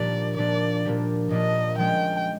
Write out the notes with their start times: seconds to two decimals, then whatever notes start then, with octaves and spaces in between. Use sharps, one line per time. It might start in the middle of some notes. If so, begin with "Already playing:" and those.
Already playing: A#2 F3 A#3 D4 G4 D5
0.37 A#2 F3 A#3 D4 G4 D5
0.85 A#2 F3 A#3 D4 G4
1.30 A#2 F3 A#3 D4 G4 D#5
1.79 F3 G#3 C#4 G5